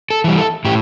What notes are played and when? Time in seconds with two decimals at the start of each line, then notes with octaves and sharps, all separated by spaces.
0.10 A4
0.24 E3 G3
0.38 A4
0.65 A2 G4